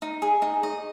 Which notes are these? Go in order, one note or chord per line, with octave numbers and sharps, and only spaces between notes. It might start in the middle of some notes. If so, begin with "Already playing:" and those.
D#4
G#4
D#4
D#5